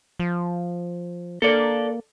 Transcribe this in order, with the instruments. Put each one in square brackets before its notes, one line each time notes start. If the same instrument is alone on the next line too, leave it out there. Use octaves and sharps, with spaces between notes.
[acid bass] F3
[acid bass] A#3 [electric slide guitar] A4 D5